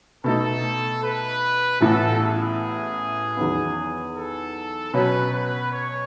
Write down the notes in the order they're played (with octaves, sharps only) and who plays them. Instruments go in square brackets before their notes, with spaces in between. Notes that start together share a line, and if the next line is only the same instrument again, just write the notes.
[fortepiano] B2 A3 D#4 [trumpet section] A4
[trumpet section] B4
[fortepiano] A1 A2 E3 B3 [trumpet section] A4
[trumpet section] G#4
[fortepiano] E2 D#3 F#3 B3
[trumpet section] A4
[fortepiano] B2 F#3 C#4 [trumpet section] B4
[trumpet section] B4
C#5